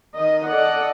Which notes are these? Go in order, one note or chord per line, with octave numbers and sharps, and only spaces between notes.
D#3 D#5
A4 D5 D#5 F#5